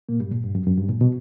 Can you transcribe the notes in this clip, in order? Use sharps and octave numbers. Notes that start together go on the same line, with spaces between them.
A#2 A#3
G2 G3
A#2
G2
F#2
F#2
G2
A#2
B2